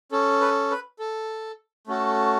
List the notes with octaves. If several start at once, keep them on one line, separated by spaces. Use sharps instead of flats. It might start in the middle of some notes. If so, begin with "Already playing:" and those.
C#4 A4
B4
B4
A4
A3 C#4 F#4 A4